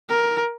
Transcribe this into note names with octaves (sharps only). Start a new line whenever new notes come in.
A#4